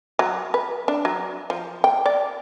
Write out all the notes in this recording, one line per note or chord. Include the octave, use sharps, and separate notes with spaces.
F#3
B4
D4
F#3
F3
G5
D5